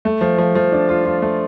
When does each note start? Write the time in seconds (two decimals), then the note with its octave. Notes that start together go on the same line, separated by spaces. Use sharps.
0.05 A3
0.21 F3
0.38 F3
0.55 F3
0.72 D4
0.89 F4
1.05 F4
1.22 A3